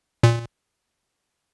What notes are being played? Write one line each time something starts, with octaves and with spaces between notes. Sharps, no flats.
A#2